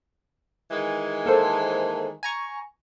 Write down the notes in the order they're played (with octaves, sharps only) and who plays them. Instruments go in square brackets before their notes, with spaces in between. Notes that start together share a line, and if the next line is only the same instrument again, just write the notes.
[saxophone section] D#3 E3 G#3
[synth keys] A#3 A4 C5
G#5 A#5 C#6